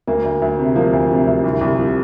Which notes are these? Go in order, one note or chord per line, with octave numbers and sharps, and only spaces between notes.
D2 A#3
D2
D2
C3
F3 A#3
D2
C3
D2
C2
C2
F3